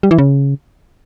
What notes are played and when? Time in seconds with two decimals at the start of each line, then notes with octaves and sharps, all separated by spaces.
0.03 G3
0.11 E3
0.18 C#3